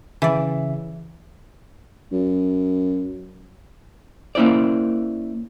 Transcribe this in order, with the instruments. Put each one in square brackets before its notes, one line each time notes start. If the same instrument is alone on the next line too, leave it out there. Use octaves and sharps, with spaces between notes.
[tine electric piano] C#3 E5 [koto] E3 D5
[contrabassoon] F#2
[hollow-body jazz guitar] A#3 C#4 E4 C5 D5